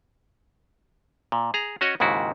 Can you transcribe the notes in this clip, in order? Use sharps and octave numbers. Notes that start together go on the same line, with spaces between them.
A#2
G#4 A#5
C#4 F#4 C#5 D#5
D#2 G#2 C#3 E4 F#4